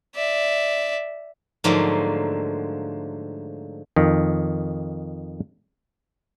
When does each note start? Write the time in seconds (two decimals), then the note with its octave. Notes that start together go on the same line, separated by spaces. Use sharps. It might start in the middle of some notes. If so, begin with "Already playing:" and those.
0.15 D5 E5
1.64 G#2 D3 F3 F#3 A3 A#3
3.96 F2 D#3